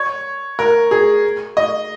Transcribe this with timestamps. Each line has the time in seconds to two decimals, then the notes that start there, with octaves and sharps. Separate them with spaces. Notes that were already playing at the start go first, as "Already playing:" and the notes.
Already playing: C#5
0.59 A#4
0.91 G#4
1.57 D#5